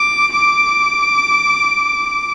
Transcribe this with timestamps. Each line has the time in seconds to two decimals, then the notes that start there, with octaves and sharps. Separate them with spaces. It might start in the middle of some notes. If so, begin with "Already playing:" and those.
Already playing: D6
0.35 D6